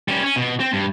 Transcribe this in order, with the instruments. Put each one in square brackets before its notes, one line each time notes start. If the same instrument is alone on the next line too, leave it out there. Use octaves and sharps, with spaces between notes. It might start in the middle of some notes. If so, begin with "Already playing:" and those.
[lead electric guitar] G3 C#4
C#4
B2
C4
G2